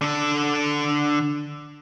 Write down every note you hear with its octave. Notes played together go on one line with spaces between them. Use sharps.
D3 A4